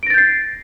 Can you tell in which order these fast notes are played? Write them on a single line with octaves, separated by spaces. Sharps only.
D7 A#6 A6 G6 C7